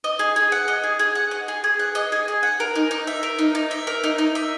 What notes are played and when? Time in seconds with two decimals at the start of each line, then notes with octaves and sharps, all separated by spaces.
0.04 D#5
0.19 G#4
0.36 G#4
0.52 F#5
0.68 D#5
0.84 G#4
0.99 G#4
1.15 F#5
1.31 D#5
1.48 G#4
1.64 G#4
1.79 F#5
1.95 D#5
2.12 G#4
2.28 G#4
2.43 F#5
2.60 A#4
2.75 D#4
2.91 D#4
3.07 E5
3.23 A#4
3.39 D#4
3.55 D#4
3.71 E5
3.87 A#4
4.04 D#4
4.18 D#4
4.35 E5